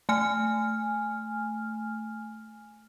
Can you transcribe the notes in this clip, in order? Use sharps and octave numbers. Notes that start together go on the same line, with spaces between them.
A3 G#5 F6